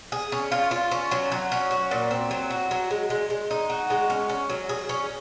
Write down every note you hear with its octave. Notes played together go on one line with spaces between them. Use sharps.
G#4
C#4
F4
F4
C#4
F#3
F#3
C#4
F#4
A#2
C4
F#3
F#4
F#3
G#3
G#3
G#3
D#4
F#4
G#3
C#4
C#4
F#3
G#4
C#4